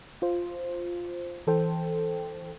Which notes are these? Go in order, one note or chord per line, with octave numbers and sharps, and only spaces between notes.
F4 C5
E3 A4 C5 G5